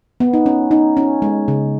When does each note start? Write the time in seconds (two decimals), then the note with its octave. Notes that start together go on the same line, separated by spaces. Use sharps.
0.20 B3
0.33 D#4
0.46 C#4
0.71 D#4
0.97 C#4
1.22 G#3
1.48 C#3